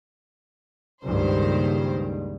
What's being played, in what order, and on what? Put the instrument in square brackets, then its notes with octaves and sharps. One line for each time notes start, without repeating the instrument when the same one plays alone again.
[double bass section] C#2 G2 [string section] A#2 D#3 C5